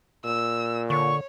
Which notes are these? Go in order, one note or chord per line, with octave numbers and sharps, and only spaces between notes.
A#2 E6
D3 C#5 C#6